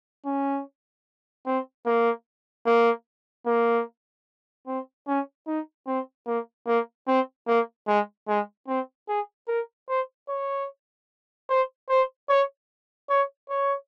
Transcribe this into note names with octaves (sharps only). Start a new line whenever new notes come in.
C#4
C4
A#3
A#3
A#3
C4
C#4
D#4
C4
A#3
A#3
C4
A#3
G#3
G#3
C4
G#4
A#4
C5
C#5
C5
C5
C#5
C#5
C#5